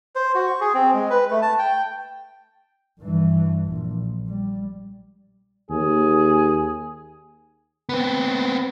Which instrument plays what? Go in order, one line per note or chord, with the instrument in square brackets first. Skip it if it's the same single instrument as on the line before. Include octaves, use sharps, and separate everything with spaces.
[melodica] C5
F#4
C#6
G#4
C4
G#3
B4
A3
A5
G5
[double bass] G2 E3
A#1
G3
[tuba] D#2 [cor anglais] G#4
[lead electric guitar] B3 C4